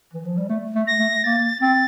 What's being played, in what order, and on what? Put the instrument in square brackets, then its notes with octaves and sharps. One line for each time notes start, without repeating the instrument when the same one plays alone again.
[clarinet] E3
F3
G3
A3
A3
[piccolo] A#6
[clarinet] A3
[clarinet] A#3 [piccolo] A6
[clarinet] C4 [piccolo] A6